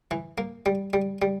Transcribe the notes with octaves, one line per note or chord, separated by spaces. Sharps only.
E3
A#3
G3
G3
G3